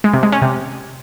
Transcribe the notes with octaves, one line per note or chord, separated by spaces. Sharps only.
G#3
C3
G#3
C#4
C3